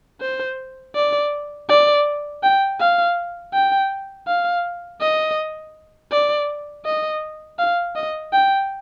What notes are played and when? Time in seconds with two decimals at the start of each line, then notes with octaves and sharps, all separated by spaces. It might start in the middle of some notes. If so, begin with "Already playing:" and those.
0.21 C5
0.95 D5
1.69 D5
2.43 G5
2.80 F5
3.53 G5
4.27 F5
5.01 D#5
6.11 D5
6.85 D#5
7.59 F5
7.95 D#5
8.32 G5